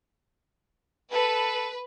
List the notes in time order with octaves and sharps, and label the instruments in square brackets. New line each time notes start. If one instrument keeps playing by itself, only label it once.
[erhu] A4 [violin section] B4